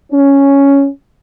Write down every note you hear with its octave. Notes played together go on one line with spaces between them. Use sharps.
C#4